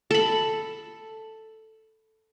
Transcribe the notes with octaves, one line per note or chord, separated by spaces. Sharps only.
A4 B5